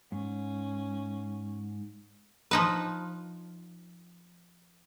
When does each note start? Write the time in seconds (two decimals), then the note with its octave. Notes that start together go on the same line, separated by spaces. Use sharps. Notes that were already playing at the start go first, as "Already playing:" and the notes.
0.12 G#2 C#4
2.51 F3 D#4 B4